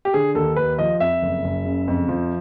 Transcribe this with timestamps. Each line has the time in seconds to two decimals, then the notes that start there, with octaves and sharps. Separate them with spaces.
0.05 G4
0.14 D3 G#4
0.35 D#2 A4
0.56 D#2 B4
0.78 F3 D#5
1.00 F2 E5
1.22 F#1
1.44 F#1
1.65 C#3
1.88 F2
2.08 F3